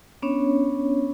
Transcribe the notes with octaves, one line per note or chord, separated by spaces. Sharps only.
B3 C#4 D4 C#5